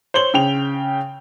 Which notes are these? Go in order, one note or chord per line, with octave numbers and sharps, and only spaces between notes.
C5 C#5 F#7 G7
C#3 G5 F7